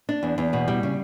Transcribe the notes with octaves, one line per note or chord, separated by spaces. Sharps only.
D4
E2
E2
B2
G3
C#3